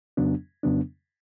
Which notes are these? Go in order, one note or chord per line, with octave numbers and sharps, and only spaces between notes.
F2 C#3 F#3 B3 D4
F2 C#3 F#3 B3 D4